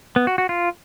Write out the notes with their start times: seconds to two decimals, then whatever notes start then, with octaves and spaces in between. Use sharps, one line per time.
0.16 B3
0.27 F#4
0.38 F#4
0.49 F4